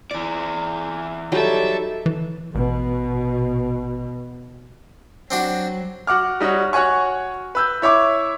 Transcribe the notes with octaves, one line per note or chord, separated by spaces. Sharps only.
E3 D5 D6
F#3 G3 D#4 A4 E5
E3
A1 B2
F#3 C4 D4 F#4
F#4 F#5 D6 F6
G3 D#4 F#4 C#5
F#4 C#5 F#5 G#5 C#6
B4 E6 G6
E4 C#5 E5 D6